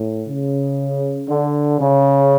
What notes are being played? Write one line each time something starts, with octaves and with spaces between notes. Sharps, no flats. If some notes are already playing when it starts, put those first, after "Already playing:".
Already playing: A2
C#3
D3
C#3